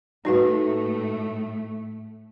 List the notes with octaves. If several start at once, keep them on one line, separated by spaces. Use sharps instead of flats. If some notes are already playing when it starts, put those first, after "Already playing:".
A2 A3 D#4 F#4 B4